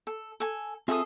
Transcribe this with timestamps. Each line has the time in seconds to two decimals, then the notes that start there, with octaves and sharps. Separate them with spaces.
0.07 A4
0.40 A4 G#5
0.88 C4 F4 G#4 A4 E5 D#6